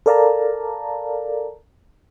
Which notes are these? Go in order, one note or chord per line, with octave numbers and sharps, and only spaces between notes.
A4 A#4 D5 F5 A5 A#5